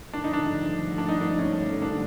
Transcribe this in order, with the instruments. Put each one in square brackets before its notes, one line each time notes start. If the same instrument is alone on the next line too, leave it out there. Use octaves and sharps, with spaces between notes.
[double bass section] G#1 G2 D3 F3 A3 [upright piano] D4
[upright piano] D#4
D4
D4
D#4
D4
C#4
D4